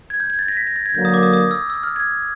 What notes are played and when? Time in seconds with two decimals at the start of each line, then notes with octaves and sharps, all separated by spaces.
0.10 G#6
0.20 G6
0.30 G#6
0.39 A6
0.48 A#6
0.57 B6
0.67 A#6
0.76 A6
0.86 G#6
0.95 D3 F#3 A#3 G6
1.05 D#6
1.14 D6
1.23 D#6
1.33 D#6
1.51 E6
1.70 E6
1.83 F6
1.96 G#6